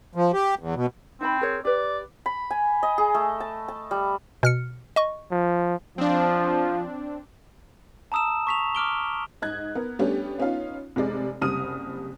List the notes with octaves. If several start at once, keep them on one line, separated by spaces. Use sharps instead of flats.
F3
G4
E2
B2
C4 D#4 G5 B5
G#4 A#4 C#5
G4 B4 D5
B5
G#5
D#5
G#4
A3
A5
A5
G3
B2 F6 C#7
D#5 C#6
F3
F3 C4 D4
A5 A#5 D#6 E6 E7
C#6 B6 F7
D6 F6 D7 G7
G#2 D#5 F#6 G#6
B3 A#4
G3 A3 B3 C#4 D4 G4
B3 C#4 D#4 F4 F5
F1 C3 G#3 D5
F#1 C2 G3 D#6 F6 D#7